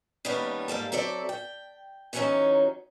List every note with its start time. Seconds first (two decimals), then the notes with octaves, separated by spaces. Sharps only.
0.25 D#3 G3 A#3 B3 C#4 D4
0.68 G#2 G3 A#3 A4
0.92 F#3 C4 A4 D5 E5
1.29 G5
2.13 C3 E3 F#3 G3 C#4 D#4